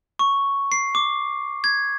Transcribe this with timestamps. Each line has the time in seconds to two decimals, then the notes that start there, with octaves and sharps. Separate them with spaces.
0.19 C#6
0.72 C7
0.95 D6
1.64 G#6